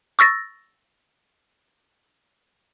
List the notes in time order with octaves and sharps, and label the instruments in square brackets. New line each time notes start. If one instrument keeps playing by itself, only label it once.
[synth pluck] C#6 E6 A6 A#6